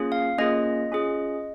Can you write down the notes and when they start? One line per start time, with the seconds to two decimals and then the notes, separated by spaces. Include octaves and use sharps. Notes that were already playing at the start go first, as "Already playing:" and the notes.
Already playing: A#3 C#4 F4 G#4
0.12 F5
0.38 A#3 C#4 F4 G#4 D#5
0.92 C#4 F4 G#4